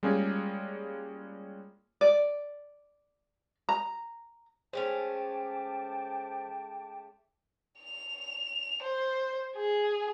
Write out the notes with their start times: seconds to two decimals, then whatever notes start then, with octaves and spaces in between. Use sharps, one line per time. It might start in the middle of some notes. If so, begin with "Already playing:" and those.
0.03 G3 G#3 A#3 C#4 F4 G#4
2.01 D5
3.69 A#5
4.73 G#3 A3 C#4 C5 G5 A5 D6
7.80 F7
8.83 C5
9.56 G#4